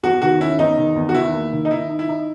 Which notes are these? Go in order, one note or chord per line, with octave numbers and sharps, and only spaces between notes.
E2 F#4
D#3 F#4
C#4 E4
E2 D#4
D#3
E2
F#4
D#3 E4
A#3
D#3
D#4
D#3 E4
D#4
E4
D#4